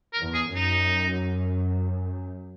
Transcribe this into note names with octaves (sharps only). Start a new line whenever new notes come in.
A#4
E2
G#4
F#2
D#4